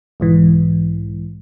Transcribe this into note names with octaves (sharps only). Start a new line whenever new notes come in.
B1 G#2 E3